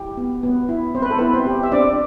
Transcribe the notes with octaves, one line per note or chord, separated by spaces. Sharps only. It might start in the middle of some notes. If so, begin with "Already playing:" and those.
Already playing: E4 G4
B3
B3
E4
C4 C5
B4
A4
B3 E4 B4
C4 C5
G4
E5
C4 D4 D5